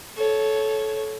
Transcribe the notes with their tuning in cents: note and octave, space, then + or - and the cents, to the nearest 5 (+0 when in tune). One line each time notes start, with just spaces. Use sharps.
A4 -20 C#5 +0